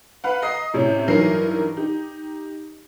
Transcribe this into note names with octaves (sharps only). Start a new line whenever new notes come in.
B4 F5 F#5
D#5 A#5 D#6 C7
A2 C3 C#4
G2 E3 F#3 D#4 A#4 C7
D#4 G4